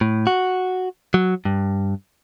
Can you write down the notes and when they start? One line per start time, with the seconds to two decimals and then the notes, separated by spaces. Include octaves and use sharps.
0.01 A2
0.27 F#4
1.14 F#3
1.45 G2